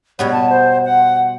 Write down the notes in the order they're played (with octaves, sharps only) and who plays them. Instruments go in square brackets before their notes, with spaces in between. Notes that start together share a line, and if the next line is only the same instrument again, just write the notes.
[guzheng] B2 G3 B3 [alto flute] C#5
[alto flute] A5
C5
F#5